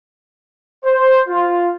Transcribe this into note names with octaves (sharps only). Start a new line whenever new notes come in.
C5
F4